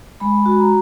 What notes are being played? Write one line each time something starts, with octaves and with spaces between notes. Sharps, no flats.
G#3 B5
F#4
A#5